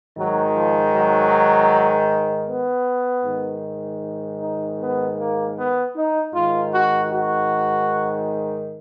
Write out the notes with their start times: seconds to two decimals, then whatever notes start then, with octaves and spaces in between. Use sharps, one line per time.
0.16 G#2 D#3 F#3
0.55 F3
0.94 F#3
2.48 B3
3.25 G#2 D#3
4.41 D#4
4.81 B3
5.18 A#3
5.57 B3
5.96 D#4
6.34 G#2 D#3 F4
6.74 F#4
7.12 F#4